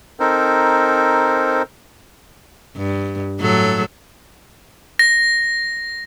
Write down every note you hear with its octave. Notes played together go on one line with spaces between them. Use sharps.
C4 D#4 A4 A#4 C5
G2
A2 F#3 A4
A#6